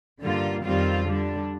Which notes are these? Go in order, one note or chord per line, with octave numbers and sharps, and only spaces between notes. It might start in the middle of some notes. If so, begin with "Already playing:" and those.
G2 D3 G3 A#3 F4
F2 D#3 G3 C4 F4
D3 G3 D4